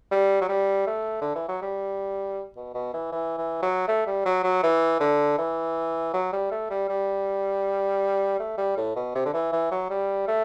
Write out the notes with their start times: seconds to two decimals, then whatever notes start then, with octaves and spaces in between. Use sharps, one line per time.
0.11 G3
0.41 F#3
0.49 G3
0.87 A3
1.21 D3
1.35 E3
1.48 F#3
1.62 G3
2.56 B2
2.74 B2
2.94 E3
3.12 E3
3.38 E3
3.62 F#3
3.88 A3
4.07 G3
4.26 F#3
4.44 F#3
4.63 E3
5.00 D3
5.38 E3
6.14 F#3
6.33 G3
6.51 A3
6.70 G3
6.89 G3
8.40 A3
8.58 G3
8.77 A2
8.96 B2
9.15 C3
9.26 D3
9.34 E3
9.52 E3
9.71 F#3
9.90 G3
10.27 A3